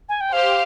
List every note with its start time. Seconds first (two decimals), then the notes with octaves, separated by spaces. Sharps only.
0.09 G#5
0.21 G5
0.33 G4 C5 F5